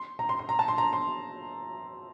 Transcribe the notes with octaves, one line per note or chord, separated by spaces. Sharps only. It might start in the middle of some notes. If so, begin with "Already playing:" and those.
Already playing: C6
A#5
C6
C6
A#5
A5
C6
A#5
C6